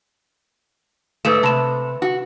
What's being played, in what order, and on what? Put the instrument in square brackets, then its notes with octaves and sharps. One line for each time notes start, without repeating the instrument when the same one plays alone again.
[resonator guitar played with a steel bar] G#2 A3 [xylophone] B4 E6 E7
[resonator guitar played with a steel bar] C3 [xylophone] A5 B5 E7
[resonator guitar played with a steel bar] F#4